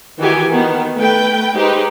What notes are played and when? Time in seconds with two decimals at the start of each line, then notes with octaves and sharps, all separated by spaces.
0.18 D#3 E3 F#4 G4 G#5
0.51 D#3 B3
0.95 A3 B4 G5
1.55 G#3 D#4 G4 B4 C5